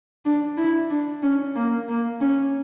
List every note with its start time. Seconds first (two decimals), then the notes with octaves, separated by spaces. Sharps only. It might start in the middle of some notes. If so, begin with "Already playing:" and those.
0.25 D4
0.57 E4
0.90 D4
1.23 C#4
1.55 A#3
1.88 A#3
2.21 C#4